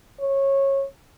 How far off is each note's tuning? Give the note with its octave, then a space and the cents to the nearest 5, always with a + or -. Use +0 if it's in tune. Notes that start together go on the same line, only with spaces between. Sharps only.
C#5 -20